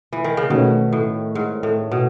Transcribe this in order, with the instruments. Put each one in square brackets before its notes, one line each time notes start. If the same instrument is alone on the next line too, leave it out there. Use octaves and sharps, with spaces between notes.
[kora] E3
D#3
C#3
[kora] B2 [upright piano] D#3 A3 C#4
[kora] A2
G#2
A2
B2